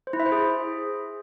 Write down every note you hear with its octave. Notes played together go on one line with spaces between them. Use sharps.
C5
E4
E5
C5
G#4